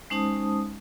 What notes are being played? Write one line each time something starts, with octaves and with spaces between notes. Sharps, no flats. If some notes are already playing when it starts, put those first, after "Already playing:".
G#3 C#4 D#4 C5 A5 D#6